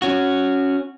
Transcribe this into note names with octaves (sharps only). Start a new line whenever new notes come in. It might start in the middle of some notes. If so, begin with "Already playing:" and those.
C#4 F#4